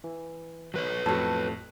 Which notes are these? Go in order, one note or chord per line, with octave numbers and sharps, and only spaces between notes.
E3
F#3 B4 C#5
F2 A2 F#4 A4 A5